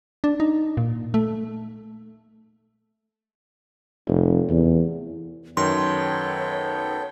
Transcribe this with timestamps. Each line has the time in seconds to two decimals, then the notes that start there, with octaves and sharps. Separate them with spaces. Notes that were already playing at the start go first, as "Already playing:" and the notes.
0.24 D4
0.40 D#4
0.77 A#2
1.14 A3
4.07 F1
4.50 E2
5.57 F#2 D#3 B3 A4 C#5 G5 C6